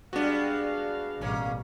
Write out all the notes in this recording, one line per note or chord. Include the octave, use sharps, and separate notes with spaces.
G3 G#3 B3 D4 F#4 F5
A1 B2 G3 A#3 C#4 G#4